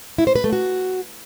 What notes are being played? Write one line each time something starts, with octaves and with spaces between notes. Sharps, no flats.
E4
C5
B4
A3
F#4